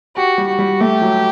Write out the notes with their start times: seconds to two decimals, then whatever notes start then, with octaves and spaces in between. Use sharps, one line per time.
0.16 F#4 G4
0.38 G3
0.48 F#4
0.59 G3
0.80 A3 G4
1.02 F#3